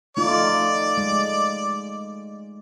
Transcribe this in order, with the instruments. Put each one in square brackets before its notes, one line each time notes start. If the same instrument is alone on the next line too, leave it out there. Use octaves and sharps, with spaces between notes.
[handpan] A3 D#4 F4 [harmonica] D5
[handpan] G#3